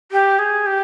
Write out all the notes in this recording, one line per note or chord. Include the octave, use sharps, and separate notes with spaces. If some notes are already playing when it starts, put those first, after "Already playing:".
G4
G#4
G4